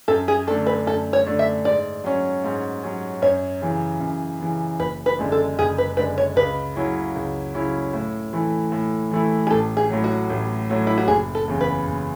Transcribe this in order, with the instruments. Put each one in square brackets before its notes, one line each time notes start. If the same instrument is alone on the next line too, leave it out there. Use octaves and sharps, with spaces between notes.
[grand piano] F#2 [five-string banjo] A4
[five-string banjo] G#4
[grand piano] D3 A3 D4 [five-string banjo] A4
[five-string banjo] B4
[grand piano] F#2 [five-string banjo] A4
[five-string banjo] C#5
[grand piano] D3 A3 D4
[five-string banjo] E5
[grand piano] G#2 [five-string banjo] D5
[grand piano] F#3 C#4
G#2
F#3 C#4
[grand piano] F#2 [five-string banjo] C#5
[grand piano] C#3 E3
F#2
C#3 E3
[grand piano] F#1 [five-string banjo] B4
[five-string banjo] B4
[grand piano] F#2 D3 G#3 D4
[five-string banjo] A4
[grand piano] F#1 [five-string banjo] G#4
[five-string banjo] B4
[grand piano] F#2 D3 G#3 D4 [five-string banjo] B4
[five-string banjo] C#5
[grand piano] C#2 [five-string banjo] B4
[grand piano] C#3 F#3 C#4 E4
C#2
C#3 F#3 C#4 E4
A2
E3 A3 E4
A2
E3 A3 E4
[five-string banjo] G#4
[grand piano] A1 [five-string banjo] A4
[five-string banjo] G#4
[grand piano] A2 F#3
[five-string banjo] F#4
[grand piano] A1
A2 F#3
[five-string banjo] E4
F#4
[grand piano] F#1 [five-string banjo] G#4
[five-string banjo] A4
[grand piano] E2 C#3
[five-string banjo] B4
[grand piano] F#1